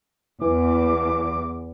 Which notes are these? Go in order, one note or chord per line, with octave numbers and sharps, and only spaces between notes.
E2 E3 D6